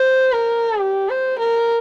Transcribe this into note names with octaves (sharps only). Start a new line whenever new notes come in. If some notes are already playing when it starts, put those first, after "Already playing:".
Already playing: C5
A#4
G4
C5
A#4